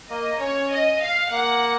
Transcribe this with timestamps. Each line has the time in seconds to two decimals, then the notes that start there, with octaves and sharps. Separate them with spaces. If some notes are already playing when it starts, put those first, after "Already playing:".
0.10 A#3 D#5
0.40 C#4 C#5
0.71 D#5
1.02 F5
1.31 A#3 F#5